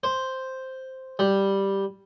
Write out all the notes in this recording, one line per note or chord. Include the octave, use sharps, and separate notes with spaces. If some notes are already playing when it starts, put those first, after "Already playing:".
C5
G3